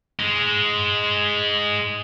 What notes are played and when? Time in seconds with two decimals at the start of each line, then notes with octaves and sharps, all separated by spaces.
0.19 G#3 D#4